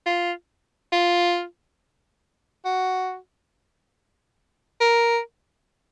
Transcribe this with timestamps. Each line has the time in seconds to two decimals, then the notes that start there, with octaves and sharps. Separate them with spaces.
0.06 F4
0.93 F4
2.65 F#4
4.81 A#4